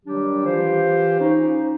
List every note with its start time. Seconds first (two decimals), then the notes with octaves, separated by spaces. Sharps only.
0.05 D#3 F#3 G3 D4 G4
0.45 E3 F4 G4 C5
1.20 C#4 D#4